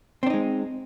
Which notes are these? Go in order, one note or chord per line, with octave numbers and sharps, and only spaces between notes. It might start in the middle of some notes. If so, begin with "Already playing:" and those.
G#3 C4 D4 D#4